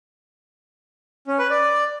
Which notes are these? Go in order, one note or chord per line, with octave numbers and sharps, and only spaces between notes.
C#4
B4
D5